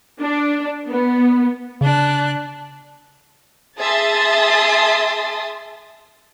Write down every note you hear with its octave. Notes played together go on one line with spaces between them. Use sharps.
D4
B3
C#3 D4 F#6
G#4 E5 A5 C6 D#6 A6